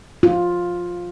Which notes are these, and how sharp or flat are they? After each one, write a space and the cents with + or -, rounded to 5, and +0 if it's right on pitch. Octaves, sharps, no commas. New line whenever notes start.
F4 +10